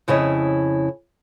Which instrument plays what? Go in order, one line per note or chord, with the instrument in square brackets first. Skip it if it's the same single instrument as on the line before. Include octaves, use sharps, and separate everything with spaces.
[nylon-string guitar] F2 C#3 E4 C#5 D#5